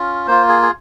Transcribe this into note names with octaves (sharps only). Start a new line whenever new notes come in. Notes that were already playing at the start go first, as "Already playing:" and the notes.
Already playing: C#4 F4
A#3 F4 C5
G#4
G#4